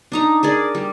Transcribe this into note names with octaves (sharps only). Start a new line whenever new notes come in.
D4 D#4 A#5
G#4 A#4 D5
G3